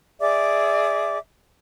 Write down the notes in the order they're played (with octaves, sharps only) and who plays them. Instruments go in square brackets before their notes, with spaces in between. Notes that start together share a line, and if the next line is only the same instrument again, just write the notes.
[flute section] G#4 D5 E5 D6